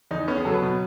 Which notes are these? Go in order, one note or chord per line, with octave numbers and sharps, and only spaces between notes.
E2 D#4
B3 C#4
G#4
F#3 A4
B4
B2